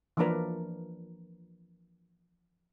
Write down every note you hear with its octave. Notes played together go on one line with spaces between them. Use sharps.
E3 F3 A#3 D4 A#4 B4